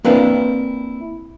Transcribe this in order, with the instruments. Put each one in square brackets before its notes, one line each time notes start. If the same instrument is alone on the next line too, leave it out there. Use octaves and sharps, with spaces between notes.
[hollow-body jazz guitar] A#3 C4 D4 E4 B4 F5